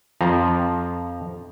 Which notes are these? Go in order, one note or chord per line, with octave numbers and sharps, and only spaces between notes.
F2 F3 A#5